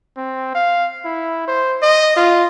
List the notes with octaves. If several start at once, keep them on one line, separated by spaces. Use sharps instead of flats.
C4
F5
E4
C5
D#5
F4